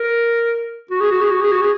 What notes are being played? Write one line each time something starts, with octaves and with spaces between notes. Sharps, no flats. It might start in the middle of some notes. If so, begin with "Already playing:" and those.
Already playing: A#4
F#4
G#4
F#4
G#4
F#4
G#4
F#4
G#4